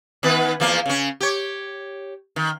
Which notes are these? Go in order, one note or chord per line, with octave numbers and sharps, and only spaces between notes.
D#3 B3 B4
E2 F3 A#3
C#3 C#4
G4 C#5
D#3